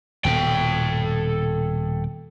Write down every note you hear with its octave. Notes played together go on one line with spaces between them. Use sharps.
D#1 B2 A4 G5